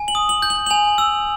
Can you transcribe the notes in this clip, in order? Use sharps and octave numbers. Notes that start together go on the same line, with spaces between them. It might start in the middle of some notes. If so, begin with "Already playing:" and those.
Already playing: G#5
F#7
D#6
F#7
G6
F#7
F#7
G#5 F7
E6